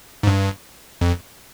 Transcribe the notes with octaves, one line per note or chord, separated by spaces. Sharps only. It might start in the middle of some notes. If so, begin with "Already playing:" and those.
G#2
G2
F2